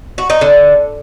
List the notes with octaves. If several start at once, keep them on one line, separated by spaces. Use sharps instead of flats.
F#4
D#4
D3